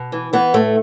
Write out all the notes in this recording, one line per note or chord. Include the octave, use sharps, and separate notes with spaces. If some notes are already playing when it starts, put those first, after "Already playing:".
Already playing: B2
E3
E3 B3
A2 A3